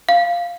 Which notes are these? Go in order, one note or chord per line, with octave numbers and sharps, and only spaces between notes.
F5